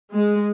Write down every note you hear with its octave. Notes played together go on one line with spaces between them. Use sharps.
G#3